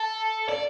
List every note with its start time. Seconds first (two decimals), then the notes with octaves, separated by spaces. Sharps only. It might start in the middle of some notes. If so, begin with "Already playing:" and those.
Already playing: A4
0.49 D5